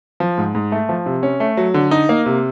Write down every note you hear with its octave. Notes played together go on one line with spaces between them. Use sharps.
F3
G#2
G#2
A3
F3
C3
C#4
A3
F#3
D3
D#4
A#3
C3